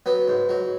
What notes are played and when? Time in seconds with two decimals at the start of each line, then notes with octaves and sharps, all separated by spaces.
0.06 F#3 B3
0.28 G#2
0.49 F#3